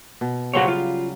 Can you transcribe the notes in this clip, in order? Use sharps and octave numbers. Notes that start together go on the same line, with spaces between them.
B2
C#3 F#3 G3 F#4 C5 C#5
F4